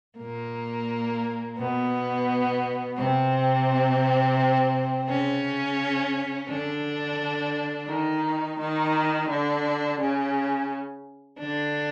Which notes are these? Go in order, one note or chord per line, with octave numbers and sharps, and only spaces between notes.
A#2 A#3
B2 B3
C3 C4
C#3 C#4
D3 D4
D#3 D#4
D#3 D#4
D3 D4
C#3 C#4
D3 D4